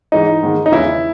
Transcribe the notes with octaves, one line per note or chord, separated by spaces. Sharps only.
G#2 E3 G#3 D#4
G#2 D#3 G#3
D#4
E2 C#3 E3 G#3 E4